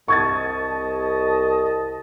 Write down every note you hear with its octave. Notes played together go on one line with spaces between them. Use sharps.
C2 D#5 A5 C#6 G#6 A6